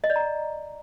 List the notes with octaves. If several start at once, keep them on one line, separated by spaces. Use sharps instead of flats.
D#5
D5
A#5